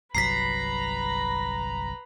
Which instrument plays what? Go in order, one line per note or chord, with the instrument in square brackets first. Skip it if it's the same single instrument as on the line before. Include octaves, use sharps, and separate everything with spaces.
[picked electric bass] G1 C2 F#3 [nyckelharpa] B4 B5 [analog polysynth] A#5 [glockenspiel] B6 C7